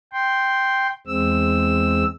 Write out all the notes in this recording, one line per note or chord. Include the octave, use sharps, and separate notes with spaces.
G5 C6
E2 G#3 C4 E6